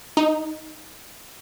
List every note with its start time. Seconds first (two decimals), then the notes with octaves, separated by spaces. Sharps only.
0.17 D#4